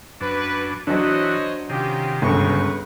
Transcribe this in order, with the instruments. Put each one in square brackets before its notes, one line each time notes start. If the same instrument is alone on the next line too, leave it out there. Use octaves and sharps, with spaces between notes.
[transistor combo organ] F#2 D4 [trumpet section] B4
[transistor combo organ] E3 F#4 [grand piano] F#3 D4 [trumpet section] C5 C#5 D#5
[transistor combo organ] C3 D#3 [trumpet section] C#4 F4 G4
[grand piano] G1 C#2 F#2 [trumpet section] B4 C#6